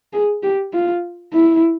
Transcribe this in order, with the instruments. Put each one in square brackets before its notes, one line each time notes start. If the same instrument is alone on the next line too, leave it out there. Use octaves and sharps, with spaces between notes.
[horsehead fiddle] G#4
G4
F4
E4